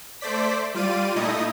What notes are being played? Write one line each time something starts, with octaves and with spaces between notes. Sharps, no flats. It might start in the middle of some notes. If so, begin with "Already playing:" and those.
A3 C5 D5 B6
G3 F4 D5 D#7
A#2 A3 D#4 E4 D#5 D#6